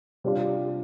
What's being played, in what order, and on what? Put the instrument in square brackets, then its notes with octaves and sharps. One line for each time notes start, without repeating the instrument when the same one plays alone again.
[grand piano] C3 G3 D4 F4